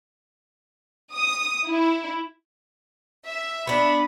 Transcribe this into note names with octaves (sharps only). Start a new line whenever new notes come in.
D#6
E4
E5
B3 D4 B5